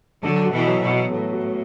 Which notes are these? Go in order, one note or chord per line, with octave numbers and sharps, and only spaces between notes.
D3 F#3 A4
F#4
B2 E3
F#3
B2
B3
A2 A4
F#4